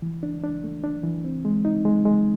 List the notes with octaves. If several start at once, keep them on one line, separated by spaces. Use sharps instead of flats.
E3
D4
D4
A3
D4
E3
C4
G#3
D#4
G#3
G#3